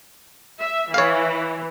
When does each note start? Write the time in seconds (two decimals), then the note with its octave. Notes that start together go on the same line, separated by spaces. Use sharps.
0.61 E5
0.94 E3 C#5 F5